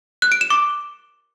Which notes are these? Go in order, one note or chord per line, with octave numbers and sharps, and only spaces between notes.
F#6
D7
E7
D6